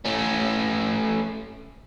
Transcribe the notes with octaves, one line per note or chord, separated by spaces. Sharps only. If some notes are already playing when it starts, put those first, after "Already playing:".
A3 C#4